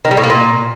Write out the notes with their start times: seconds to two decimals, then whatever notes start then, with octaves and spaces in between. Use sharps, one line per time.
0.05 D#3
0.11 G3
0.17 A2
0.24 A#3
0.30 A#2